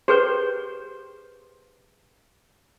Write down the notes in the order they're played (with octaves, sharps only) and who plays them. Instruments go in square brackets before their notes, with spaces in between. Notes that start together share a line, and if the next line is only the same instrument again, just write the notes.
[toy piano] G4 G#4 B4 [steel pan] C5